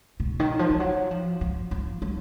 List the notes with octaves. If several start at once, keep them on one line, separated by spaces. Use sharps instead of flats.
B2
D#3
F3
F3
F#3
F3
F3
F3
F#3